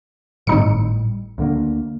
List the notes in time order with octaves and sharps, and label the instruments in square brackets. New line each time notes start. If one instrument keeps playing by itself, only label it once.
[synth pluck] G#1 D#4 C#7 [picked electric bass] A2 G3
[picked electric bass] D2 D3 A#3